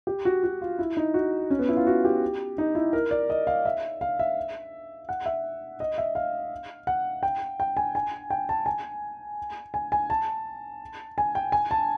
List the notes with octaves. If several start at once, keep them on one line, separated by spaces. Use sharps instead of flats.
G4
F#4
F#4
F4
E4
D#4
F#4
C#4
B3
E4
F4
F#4
G4
D#4
E4
A#4
D5
D#5
F5
E5
F5
E5
F#5
E5
D#5
E5
F5
F#5
G5
G5
G#5
G#5
G5
A5
G#5
G#5
G#5
A5
G#5
G5
G#5
A5